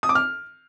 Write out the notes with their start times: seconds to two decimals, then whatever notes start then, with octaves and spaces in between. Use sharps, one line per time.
0.03 D#6
0.09 D6
0.15 F6